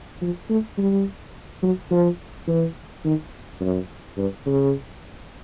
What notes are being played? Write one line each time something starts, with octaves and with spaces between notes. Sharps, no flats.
F3
A3
G3
F#3
F3
E3
D#3
F#2
G2
C#3